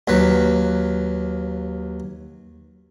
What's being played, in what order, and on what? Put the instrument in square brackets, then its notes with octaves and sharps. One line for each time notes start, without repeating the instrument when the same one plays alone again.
[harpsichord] D#2 F#3 B4